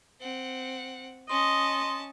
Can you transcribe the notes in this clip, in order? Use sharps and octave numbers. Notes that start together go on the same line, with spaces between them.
C4 F#5
C#4 D#5 A5 C6